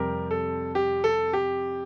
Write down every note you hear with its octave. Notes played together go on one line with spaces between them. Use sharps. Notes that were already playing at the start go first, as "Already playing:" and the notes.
Already playing: F2 C3 G3 G4 A#4
A4
G4
A4
G4